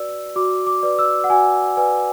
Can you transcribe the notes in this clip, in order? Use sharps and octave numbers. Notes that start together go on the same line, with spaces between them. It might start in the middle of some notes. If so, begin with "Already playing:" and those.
Already playing: F#4 B4 D5 E6
F#4 D6
D6
B4 D5
E6
F#5
F#4 G#5
B4 D5 G#5